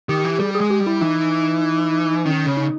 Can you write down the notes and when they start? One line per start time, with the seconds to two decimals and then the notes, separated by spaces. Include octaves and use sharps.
0.09 D#3 G4
0.24 E3
0.39 G3 G#4
0.55 G#4
0.61 G#3
0.70 G4
0.81 G3
0.87 E4
1.01 E3 D#4
2.25 D#3 C#4
2.46 C#3
2.57 D#4